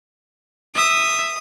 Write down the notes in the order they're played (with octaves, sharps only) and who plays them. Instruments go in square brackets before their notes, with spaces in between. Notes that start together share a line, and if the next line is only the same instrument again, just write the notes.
[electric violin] E5 [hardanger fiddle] D#6